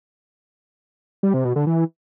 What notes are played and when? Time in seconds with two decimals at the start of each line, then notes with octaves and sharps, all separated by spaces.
1.23 G3
1.34 C3
1.45 B2
1.56 D3
1.67 E3